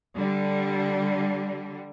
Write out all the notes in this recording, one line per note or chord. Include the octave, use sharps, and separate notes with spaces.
D3 G3